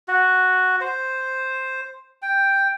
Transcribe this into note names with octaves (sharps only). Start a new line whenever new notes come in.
F#4
C5
G5